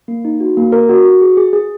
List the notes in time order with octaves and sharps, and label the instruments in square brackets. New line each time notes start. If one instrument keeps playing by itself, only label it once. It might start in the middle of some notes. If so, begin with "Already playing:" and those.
[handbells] A#3
D#4
F#4
A#3
A#4
F#4
F#4
G#4
G#4
G#4